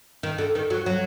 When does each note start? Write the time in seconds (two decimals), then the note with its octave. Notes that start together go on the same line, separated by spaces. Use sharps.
0.23 D#3
0.38 D3
0.55 D#3
0.70 F#3
0.86 F#3